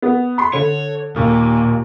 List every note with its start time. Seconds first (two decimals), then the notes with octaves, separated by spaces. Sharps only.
0.02 B3
0.38 B5 C6
0.53 D3 C#5
1.16 D#2 A#2